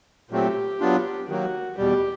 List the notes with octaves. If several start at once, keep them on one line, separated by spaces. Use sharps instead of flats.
A#2 F#3 A3 C4 G4
F#3 B3 D4 F4
D#3 F#3 A#3 F#4
E2 B2 G3 G4